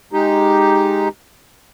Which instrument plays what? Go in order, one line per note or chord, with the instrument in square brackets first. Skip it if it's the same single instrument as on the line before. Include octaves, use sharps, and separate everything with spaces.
[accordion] G#3 D#4 G4